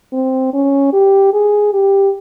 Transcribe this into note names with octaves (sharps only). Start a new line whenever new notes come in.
C4
C#4
G4
G#4
G4